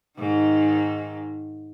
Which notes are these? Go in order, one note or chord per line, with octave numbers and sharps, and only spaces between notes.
G#2 D#3